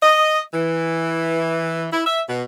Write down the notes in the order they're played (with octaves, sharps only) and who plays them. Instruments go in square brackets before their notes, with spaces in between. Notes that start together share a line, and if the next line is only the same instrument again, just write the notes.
[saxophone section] D#5
E3
E4
E5
B2